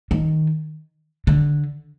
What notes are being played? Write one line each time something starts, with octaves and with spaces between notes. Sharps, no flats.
D#3
D3